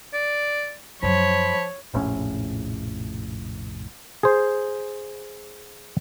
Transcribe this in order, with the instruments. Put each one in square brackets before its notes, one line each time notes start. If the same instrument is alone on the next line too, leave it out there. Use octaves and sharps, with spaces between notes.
[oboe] D5
[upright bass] F#2 F#3 [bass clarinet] F3 [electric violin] C#5 [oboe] B5
[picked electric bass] F1 A#1 A2 C#4
[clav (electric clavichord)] G#4 C5